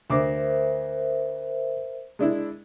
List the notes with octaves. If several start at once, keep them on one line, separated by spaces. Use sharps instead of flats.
D2 A#4 C5 E5 D6
G#3 D4 E4